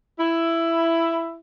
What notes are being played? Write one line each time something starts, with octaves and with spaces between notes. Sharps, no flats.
E4